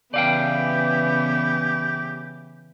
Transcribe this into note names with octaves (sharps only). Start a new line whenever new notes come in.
C#3 E3 B3 G4 D5 F5 G5